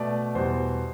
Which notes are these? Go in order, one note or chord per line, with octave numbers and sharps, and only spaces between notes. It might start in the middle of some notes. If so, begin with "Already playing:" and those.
Already playing: B2 A3 D5
E2 B2 G3 C5